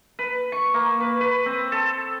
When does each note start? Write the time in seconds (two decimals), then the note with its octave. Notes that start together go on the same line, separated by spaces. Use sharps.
0.19 B4
0.52 C#6
0.74 A#3
1.00 B4
1.21 B4
1.46 C4
1.72 A4